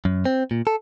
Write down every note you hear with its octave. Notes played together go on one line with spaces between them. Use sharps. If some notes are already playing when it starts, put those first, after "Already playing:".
F#2
C4
A#2
A4